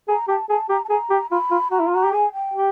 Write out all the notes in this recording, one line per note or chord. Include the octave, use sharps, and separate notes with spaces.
G#4 A#5
G4 A5
G#4 A5
G4 A#5
A5
G#4 A#5
G4
F4 B5
F4
F#4 A#5
E4
F4
F#4 A#5
G4
G#4 G#5
G5
G4